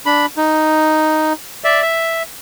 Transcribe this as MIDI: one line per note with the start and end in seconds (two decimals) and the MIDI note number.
0.06 0.26 62
0.06 0.26 83
0.37 1.33 63
1.64 1.82 74
1.64 1.82 76
1.82 2.23 76